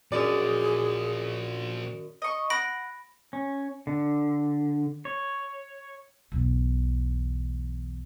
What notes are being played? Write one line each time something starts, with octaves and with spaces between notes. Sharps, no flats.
F#2 A#2 F3 G#4 D5 D#5
D#5 C#6
F#5 B5 A#6 D7
C#4
D3
C#5
B1 E2